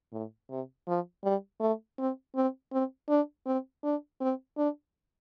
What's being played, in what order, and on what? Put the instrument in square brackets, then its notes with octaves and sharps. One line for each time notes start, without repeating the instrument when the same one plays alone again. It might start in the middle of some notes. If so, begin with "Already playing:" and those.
[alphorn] A2
C3
F3
G3
A3
C4
C4
C4
D4
C4
D4
C4
D4